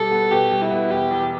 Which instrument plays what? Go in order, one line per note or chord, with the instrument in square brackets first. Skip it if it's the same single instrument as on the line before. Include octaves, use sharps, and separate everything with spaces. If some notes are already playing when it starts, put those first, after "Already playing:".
Already playing: [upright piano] B2 G3 [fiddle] A4
[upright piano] B3
[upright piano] B2 [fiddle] G4
[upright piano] G3
[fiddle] E4
[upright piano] B3
[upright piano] E1 [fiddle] G4
[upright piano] E2